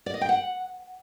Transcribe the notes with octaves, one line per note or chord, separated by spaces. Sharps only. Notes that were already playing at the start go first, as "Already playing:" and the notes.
D5
D#5
G5
F#5